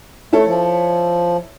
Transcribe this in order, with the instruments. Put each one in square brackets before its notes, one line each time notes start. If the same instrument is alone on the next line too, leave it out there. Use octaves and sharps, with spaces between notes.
[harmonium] A3 [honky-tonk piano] E4 A4 C#5
[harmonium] F3